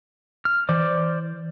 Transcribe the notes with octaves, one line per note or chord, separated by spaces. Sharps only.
F6
E3 C5 D5 D6